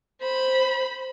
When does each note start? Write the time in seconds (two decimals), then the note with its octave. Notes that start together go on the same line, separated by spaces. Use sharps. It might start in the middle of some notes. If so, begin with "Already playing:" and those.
0.21 C5 B5